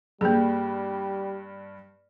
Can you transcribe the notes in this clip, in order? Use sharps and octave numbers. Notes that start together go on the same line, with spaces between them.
G2 G3 A#3 G#4